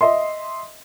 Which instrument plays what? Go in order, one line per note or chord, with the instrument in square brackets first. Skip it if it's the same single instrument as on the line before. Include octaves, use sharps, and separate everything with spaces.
[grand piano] D#5 E5 C6